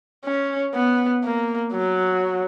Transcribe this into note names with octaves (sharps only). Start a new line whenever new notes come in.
C#4
B3
A#3
F#3